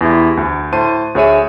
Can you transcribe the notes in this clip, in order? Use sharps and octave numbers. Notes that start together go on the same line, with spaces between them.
E2 E4 G4
D2
A2 C5 A5 C6 D#7
D2 G#4 C#5 E5 D#7